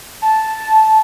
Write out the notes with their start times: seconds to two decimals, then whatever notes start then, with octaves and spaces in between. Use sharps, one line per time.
0.22 A5